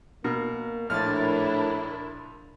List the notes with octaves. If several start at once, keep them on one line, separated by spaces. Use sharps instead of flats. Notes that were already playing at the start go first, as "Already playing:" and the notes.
B2 A#3 A#4
A#1 A2 D4 E4 A#4 F6 A6